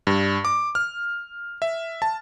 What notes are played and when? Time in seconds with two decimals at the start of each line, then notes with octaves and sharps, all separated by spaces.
0.07 G2
0.45 D6
0.75 F6
1.62 E5
2.02 A5